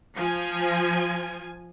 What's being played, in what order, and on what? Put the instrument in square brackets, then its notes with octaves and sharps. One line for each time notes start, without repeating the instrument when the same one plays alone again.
[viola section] F3 G#5